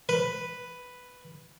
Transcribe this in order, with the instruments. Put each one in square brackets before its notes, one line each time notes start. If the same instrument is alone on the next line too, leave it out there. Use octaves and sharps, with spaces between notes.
[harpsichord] B4